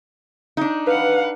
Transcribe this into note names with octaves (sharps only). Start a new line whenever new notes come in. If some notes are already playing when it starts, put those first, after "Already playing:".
D4 D#4
B4 F5 F#5